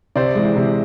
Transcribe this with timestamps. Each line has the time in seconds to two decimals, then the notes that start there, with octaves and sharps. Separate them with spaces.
0.16 C3 C5 D5
0.35 E3 G#3
0.56 C3